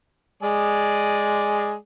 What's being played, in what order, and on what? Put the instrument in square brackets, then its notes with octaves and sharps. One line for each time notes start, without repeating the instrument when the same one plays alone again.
[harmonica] G#3 G#4 D5